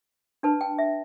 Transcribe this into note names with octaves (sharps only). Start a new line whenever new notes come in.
D4 B4 A5
G5
E5